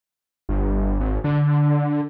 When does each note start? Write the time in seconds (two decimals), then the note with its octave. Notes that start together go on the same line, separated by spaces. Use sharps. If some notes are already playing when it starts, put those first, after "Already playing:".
0.49 G1
1.00 G#1
1.24 D3